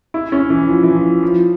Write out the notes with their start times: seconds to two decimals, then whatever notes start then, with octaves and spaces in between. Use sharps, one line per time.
0.14 E4
0.32 C#4
0.50 E3
0.68 F3
0.83 E3
0.95 F3
1.23 F3